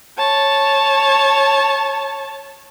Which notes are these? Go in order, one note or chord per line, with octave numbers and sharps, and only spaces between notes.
C#5 A5